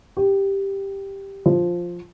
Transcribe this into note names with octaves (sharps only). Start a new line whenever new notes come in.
G4
F3